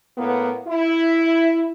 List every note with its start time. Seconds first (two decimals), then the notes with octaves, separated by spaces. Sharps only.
0.18 A2 A#3 B3
0.68 E4